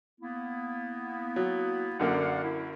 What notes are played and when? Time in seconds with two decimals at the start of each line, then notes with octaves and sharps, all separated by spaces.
0.21 A#3 B3 E4
1.36 F#3
2.00 F#2 D3 A#3 D5 F5 F#5
2.44 E4